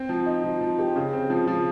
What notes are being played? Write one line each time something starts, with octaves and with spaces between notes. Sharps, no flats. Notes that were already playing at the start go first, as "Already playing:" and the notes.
Already playing: C4
F3
D#4
F3
F3
G4
C#3
C4
F3
F3